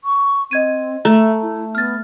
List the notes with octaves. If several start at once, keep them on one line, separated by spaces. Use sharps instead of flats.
C#6
C4 D#5 G#6 D#7
A3 E5 A#5
E4
B3 F6 A6